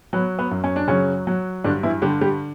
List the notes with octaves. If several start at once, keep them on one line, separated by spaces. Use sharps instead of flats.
F#3 B3
B3
F#2
C#4
D4
C#3 F#3 C#4
F#3
G2 D3 D4
E3 E4
D3 G3 G4
G3 G4